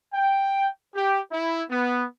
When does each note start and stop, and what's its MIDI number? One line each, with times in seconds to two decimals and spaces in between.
0.14 0.68 79
0.95 1.20 67
1.32 1.62 64
1.70 2.04 59